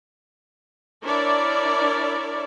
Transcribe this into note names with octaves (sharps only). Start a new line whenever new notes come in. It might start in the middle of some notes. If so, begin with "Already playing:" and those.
D4 E4 A#4 C#5 D5